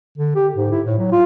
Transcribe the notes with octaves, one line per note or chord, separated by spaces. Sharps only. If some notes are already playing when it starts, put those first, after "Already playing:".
D3
G4
G#2
E4
A2
F#3
F4